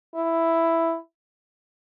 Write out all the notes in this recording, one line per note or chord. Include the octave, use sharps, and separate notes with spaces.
E4